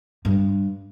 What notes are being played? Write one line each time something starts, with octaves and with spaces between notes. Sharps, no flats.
G2